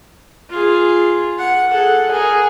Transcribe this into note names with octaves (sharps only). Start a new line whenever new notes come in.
F4 G#4
F#5
G#4 A4 F#5
G#4 A#4